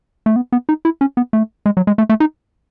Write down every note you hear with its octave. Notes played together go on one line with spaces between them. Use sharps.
A3
B3
B3
D#4
E4
C#4
B3
A3
G#3
F#3
G#3
A3
A3
D#4